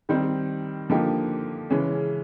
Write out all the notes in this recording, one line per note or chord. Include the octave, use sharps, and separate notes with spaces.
D#3 G3 C4 D#4
D3 F3 A#3 D#4 G4
C#3 E3 G#3 C#4